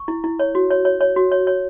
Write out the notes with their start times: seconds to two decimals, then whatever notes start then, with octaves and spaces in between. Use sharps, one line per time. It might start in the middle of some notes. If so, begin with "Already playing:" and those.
Already playing: C#6
0.08 E4
0.24 E4
0.39 C#5
0.55 F#4
0.71 C#5
0.85 C#5
1.01 C#5
1.16 F#4
1.32 C#5
1.47 C#5